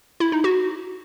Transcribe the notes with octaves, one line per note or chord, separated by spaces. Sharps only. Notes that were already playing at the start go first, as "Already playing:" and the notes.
E4
D#4
F#4